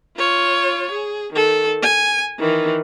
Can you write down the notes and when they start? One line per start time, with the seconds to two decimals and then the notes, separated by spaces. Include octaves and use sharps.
0.17 F4 C#5
0.91 G#4
1.33 D#3 A4
1.82 G#5
2.39 D#3 E3